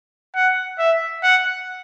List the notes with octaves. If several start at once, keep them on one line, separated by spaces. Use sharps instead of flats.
F#5
E5
F#5